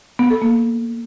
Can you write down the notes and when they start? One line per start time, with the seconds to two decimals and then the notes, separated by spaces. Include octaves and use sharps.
0.19 B3
0.30 A4
0.42 A#3